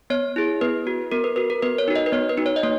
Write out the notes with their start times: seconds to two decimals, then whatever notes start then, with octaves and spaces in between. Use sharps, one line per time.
0.10 B3 C#5
0.36 E4 G#4
0.61 B3 B4
0.87 F#4
1.12 B3 A#4
1.24 B4
1.36 F#4 B4
1.50 A#4
1.62 B3 B4
1.78 C#5
1.88 D#4 F#4
1.96 D#5
2.06 B4
2.12 B3 C#5
2.29 B4
2.38 D#4 F#4
2.46 C#5
2.56 D#5
2.63 A#3 C#5